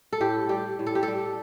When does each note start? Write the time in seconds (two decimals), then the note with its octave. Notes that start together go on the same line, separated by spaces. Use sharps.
0.13 A4
0.20 A2 G4
0.49 G3 G4
0.79 A2
0.86 A4
0.95 G4
1.03 A4
1.08 G3